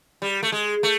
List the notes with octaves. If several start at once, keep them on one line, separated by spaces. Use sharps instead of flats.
G3
A3
G#3
A3